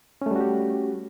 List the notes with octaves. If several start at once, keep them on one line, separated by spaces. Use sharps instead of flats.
G3 A3 C#4 F#4 G4